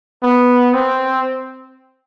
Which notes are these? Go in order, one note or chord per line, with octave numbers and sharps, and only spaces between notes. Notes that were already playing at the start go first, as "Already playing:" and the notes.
B3
C4